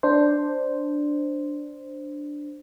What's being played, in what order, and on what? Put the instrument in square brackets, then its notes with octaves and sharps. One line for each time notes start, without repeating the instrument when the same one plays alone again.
[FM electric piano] D4 C5